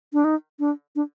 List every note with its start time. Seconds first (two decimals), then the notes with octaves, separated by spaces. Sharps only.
0.13 D4
0.24 D#4
0.60 D4
0.96 D4